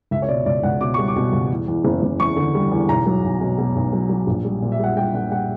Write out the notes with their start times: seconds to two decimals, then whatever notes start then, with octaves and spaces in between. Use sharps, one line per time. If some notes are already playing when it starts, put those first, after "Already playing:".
0.11 C#2 E5
0.22 C#5
0.28 B2 D5
0.46 C#2 D5
0.63 C#2 F#5
0.81 B2 D6
0.94 G3 C#6
1.08 D6
1.16 B2
1.32 C#2
1.50 E2
1.68 E2
1.85 F#1
2.03 F#1
2.20 E2 C#6
2.36 D3
2.55 G3
2.71 E2
2.89 B1 A#5
3.06 F#3
3.23 B1
3.41 B2
3.58 B2
3.76 B1
3.93 F#3
4.10 F#3
4.27 A#1
4.45 G3
4.62 A#2
4.72 E5
4.79 G3 F#5
4.97 G3 G5
5.14 A#2 F#5
5.31 G3 F#5